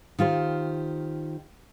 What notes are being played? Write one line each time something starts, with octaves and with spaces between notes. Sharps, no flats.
D#3 F4 G4 C5